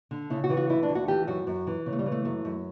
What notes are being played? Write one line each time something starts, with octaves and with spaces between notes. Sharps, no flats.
D3
C#3 E4
F#4
E3
F#4
D2 E4
D4
D2
F#4
E3 G4
F#2 F#4
F#2
E3
C#3
A3
G3
E3
A3
F#2 A3
F#2